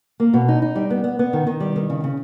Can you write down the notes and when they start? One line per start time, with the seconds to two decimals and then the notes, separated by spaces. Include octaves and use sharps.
0.20 A#3
0.34 B2
0.48 D#4
0.62 D#4
0.76 G3
0.90 B3
1.04 B3
1.19 B3
1.33 D#3
1.47 D#3
1.60 G3
1.76 D#3
1.90 C#3
2.04 C#3